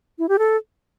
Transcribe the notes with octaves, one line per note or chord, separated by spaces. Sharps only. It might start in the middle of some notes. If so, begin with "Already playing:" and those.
E4
G4
A4